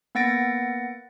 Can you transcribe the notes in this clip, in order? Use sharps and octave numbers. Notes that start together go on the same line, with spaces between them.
A#3 B3 F#5 A6 A#6 D7